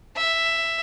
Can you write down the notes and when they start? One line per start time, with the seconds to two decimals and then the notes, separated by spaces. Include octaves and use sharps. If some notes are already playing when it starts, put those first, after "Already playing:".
0.17 E5